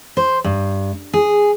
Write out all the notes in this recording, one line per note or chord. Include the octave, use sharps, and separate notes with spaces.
C5
G2
G#4